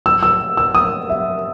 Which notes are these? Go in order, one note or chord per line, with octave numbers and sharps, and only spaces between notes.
E6
E6
E6
D#6
E5